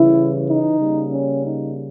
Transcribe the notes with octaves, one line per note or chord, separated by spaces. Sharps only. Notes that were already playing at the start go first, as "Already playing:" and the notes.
Already playing: C#3 E3 G3 E4
D#4
C#3 G3 A#3
C#4
D#4